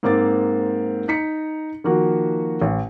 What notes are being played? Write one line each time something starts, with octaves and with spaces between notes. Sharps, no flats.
G#2 A#3 C4 D6 A6
D#4 A#5 B6 C#7
D#3 F3 A#3 F#4
A1